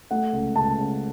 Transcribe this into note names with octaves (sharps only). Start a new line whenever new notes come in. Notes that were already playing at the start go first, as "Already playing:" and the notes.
A3 F#5
C#2
C#2 A5
C#3